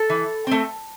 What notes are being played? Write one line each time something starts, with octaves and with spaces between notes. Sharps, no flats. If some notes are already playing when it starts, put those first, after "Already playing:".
Already playing: A4
E3
A3 C4